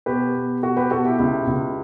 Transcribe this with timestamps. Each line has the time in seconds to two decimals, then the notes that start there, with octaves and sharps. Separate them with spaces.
0.06 B2 G4 B4
0.34 B2
0.63 B2 F#4 A4
0.77 G4 B4
0.91 B2 F#4 A4
1.05 E4 G4
1.18 C#2 E4 G4
1.47 C#2